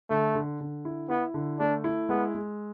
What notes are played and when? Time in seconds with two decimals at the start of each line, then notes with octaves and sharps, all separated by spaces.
0.10 D3 A3
0.35 D3
0.61 D3
0.85 E4
1.10 B3 E4
1.34 D3
1.60 A3 D4
1.84 E4
2.09 G#3 B3
2.35 G#3